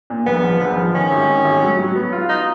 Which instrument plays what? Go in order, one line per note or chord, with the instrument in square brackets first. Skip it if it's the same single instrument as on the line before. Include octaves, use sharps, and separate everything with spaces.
[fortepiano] A#2
[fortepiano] A#1 [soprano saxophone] B3
[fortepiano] F3
A#1
F3
[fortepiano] D#3 [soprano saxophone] C#4
[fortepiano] G#1
D#3
G#1
F#3
F#3
B3
F4
[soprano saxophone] D#4